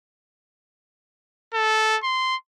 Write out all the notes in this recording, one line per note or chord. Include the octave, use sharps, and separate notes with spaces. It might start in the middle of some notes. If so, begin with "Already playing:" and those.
A4
C6